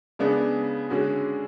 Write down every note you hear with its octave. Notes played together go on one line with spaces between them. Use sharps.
C#3 G#3 B3 D4
D3 G#3 C#4 F#4